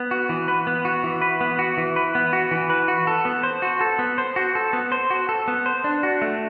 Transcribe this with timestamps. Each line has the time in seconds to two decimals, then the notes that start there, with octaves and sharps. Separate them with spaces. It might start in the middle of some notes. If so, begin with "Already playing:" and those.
Already playing: B3
0.11 F#4
0.29 E3
0.48 B4
0.67 B3
0.85 F#4
1.03 E3
1.22 B4
1.41 B3
1.59 F#4
1.77 E3
1.96 B4
2.15 B3
2.33 F#4
2.51 E3
2.70 B4
2.88 F#4
3.07 A4
3.25 B3
3.43 C5
3.62 F#4
3.81 A4
3.99 B3
4.18 C5
4.36 F#4
4.55 A4
4.73 B3
4.92 C5
5.10 F#4
5.29 A4
5.48 B3
5.66 C5
5.84 D4
6.03 F#4
6.22 A3